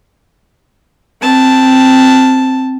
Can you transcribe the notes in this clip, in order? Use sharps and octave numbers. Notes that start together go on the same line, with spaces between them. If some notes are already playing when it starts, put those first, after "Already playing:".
C4 A5